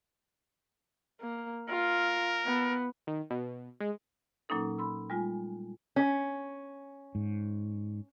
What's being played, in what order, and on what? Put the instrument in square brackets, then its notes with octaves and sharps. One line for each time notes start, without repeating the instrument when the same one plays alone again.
[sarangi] A#3
[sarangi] F4 [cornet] A#4
[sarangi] B3
[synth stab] D#3
B2
G#3
[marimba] A#2 F#3 A#3 C#4 D#4 A4
B5 C6 E6
G3 G#3 F4 G#5
[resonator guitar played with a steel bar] C#4
[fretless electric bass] G#2